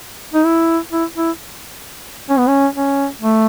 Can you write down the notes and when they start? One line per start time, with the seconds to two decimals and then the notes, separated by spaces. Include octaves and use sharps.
0.34 D#4
0.45 E4
0.92 E4
1.16 E4
2.29 C#4
2.38 B3
2.47 C#4
2.75 C#4
3.21 A3